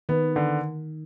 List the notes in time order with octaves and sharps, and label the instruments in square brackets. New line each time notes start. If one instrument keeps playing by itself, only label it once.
[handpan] D#3 [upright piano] B3
[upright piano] D3